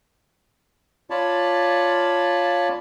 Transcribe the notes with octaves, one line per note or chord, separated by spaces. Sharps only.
F4 C#5 D5 A5 B5